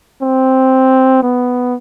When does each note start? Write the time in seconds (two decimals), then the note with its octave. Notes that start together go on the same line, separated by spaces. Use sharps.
0.22 C4
1.23 B3